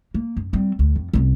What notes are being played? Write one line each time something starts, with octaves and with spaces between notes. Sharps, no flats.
A#3
F#2
G3 C4
D2
F2
C2 C#4